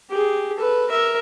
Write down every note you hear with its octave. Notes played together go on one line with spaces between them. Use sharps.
G4 G#4
A4 B4
A#4 E5